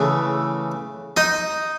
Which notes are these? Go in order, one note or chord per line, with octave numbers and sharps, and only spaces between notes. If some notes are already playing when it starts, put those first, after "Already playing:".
Already playing: C#3 E3 A3
D#4 D#5